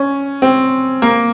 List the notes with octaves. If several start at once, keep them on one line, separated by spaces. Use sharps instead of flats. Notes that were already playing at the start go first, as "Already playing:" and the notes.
Already playing: C#4
C4
A#3